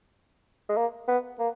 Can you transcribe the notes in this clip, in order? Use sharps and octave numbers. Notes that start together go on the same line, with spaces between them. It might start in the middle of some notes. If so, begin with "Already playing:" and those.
G#3
A#3
B3
A#3